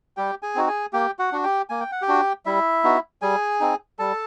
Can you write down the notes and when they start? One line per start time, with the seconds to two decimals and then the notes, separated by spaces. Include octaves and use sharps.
0.17 G3 G4 G5
0.42 G#4 G#5
0.55 C4 D#4 F#4
0.68 G#4 G#5
0.93 A#3 G4 G5
1.19 F#4 F#5
1.32 D4 F#4
1.44 G4 G5
1.69 A#3 G#5
1.80 G5
1.92 F#5
2.02 G4 G5
2.08 D4 F#4
2.46 G3 E4 E5
2.84 B3 D#4 F#4
3.22 G3 G#4 G#5
3.60 C4 D#4
3.99 G3 A4 A5